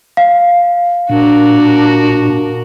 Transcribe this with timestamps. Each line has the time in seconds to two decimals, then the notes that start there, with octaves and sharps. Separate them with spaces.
0.17 F5
1.10 A#2 D4 F#4 A#4